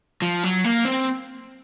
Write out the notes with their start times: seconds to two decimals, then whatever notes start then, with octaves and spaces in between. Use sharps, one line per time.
0.22 F3
0.44 F#3
0.64 A#3
0.85 C4